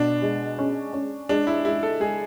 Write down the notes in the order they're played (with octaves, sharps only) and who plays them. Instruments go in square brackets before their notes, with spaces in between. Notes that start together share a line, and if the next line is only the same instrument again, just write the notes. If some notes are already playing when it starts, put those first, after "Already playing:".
Already playing: [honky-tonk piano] B2 [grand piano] D4
[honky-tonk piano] G#3
C#4
C#4
[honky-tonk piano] G#3 [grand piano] D4
[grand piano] E4
[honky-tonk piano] G#3 [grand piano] E4
[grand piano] A4
[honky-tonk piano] G#3 [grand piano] G#4